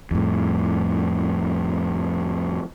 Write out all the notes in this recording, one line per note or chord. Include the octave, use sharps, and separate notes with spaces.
F2 A2